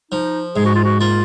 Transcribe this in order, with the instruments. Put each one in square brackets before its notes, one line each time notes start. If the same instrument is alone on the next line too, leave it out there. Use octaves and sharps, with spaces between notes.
[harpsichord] F3 [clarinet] D#4
[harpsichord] G#2 [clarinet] G#4
[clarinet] F#4
F4
F#4
[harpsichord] A#3 [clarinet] F4